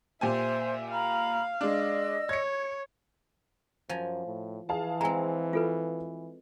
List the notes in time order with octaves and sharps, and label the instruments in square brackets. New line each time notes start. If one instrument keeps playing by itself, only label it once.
[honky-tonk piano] A#2 G4 G#5 [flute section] C5 [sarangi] E5
[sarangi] F5 [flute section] A#5 B5
[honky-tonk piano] G#3 D4 [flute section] D5 D#5 E6
[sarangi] C#5 [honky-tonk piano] G#6 C#7
[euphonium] F#2 [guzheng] F3 G#5 A#5
[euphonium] A2
[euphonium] E3 [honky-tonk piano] G#4 F5 A5
[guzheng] G#3 C4 [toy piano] G#5 A#5
[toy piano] F4 A4 B4